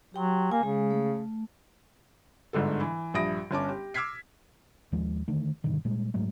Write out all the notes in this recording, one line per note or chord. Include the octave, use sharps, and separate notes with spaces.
F#3 G4 G5 C6
A#3 G#5
C#3 G#3
A3
G1 G#2 D3 A4
E3
A#1 G2 E5 D#6 A#6 D7
G1 C#4 A5 D6
G4
D6 E6 F6 G#6 B6 C7
D#2 F3 G#3
D3 D#3 A3
G2 B2 D3 D#3
A#2 G3 G#3
G#2 F#3 G#3 A3